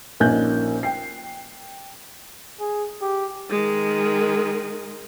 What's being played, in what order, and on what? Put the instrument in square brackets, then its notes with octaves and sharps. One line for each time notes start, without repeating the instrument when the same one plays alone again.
[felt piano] A#1 A#3 C#4 D#4 F#6 G6
G5 C7
[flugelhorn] G#4
G4
[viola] D#3 G#3